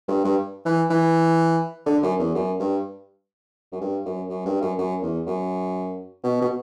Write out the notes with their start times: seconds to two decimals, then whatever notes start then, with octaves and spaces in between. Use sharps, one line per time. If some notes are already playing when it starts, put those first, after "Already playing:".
0.08 G2
0.24 G2
0.65 E3
0.90 E3
1.86 D3
2.03 F#2
2.19 E2
2.35 F#2
2.59 G2
3.72 F#2
3.81 G2
4.05 F#2
4.29 F#2
4.45 G2
4.62 F#2
4.78 F#2
5.02 E2
5.26 F#2
6.23 B2
6.41 B2